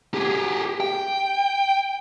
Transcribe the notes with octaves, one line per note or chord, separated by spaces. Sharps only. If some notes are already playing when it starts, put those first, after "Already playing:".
G4 G#4
G5